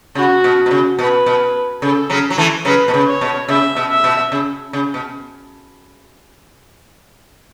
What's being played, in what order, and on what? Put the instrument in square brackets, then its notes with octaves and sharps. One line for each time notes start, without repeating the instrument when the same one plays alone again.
[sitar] C#3 [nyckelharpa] F#4
[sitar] B2
B2
C#3
[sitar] B2 [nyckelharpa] B4
[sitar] B2
[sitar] C#3 [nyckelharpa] A4
[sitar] C#3 F#3
F#3
E3 A3
[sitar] C#3 F#3 [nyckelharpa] B4
[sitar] B2
C#3
[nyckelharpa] C#5
[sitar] B2
[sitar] C#3 [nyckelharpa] E5
[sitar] B2
[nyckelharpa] E5
[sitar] B2
C#3
C#3
B2